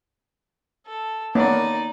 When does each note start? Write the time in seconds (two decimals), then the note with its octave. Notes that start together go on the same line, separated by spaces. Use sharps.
0.87 A4
1.35 A#3 B3 C#4 D#4 D5